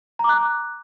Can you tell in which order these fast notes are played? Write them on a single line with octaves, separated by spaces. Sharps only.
A#5 D6 F#6